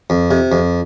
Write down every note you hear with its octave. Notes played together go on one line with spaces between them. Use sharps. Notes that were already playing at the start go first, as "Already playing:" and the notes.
F2
C3
F2